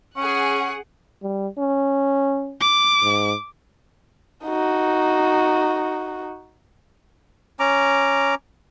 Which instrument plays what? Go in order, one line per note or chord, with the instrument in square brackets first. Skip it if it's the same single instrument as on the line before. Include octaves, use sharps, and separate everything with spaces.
[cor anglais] C#4 [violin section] G#4 F#5
[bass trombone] G3
C#4
[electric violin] D6
[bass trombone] G#2
[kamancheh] D#4 F#4
[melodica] C#4 A#5 D6